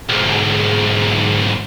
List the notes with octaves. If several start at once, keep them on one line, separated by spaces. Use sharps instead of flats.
B1 G#2